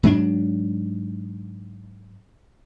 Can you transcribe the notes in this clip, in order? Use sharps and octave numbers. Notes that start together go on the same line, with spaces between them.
G#2 F#3 D4